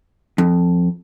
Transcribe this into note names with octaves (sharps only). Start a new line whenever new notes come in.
F2